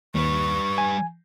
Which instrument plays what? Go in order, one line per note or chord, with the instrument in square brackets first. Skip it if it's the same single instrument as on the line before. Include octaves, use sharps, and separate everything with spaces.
[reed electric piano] D#2 [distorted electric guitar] G3 B4 [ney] C#6
[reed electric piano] G#5